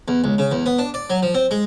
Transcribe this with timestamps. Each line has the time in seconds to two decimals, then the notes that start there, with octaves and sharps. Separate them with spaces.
0.08 E2
0.24 C#2
0.38 C#3
0.52 E2
0.66 B3
0.79 D4
0.94 D5
1.10 F#3
1.23 F3
1.34 C4
1.51 G#3